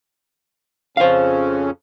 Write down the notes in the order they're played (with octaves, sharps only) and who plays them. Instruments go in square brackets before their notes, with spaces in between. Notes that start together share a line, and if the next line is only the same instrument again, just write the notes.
[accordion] F2 C#3 C#4 [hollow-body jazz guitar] C5 F5